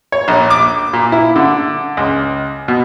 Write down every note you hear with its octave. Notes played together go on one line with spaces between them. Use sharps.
C#5
A#1
D6
A#2
E4
D3
C#2
B2